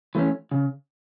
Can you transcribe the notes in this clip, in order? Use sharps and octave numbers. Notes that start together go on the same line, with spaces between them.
E3 A3 C#4
C#3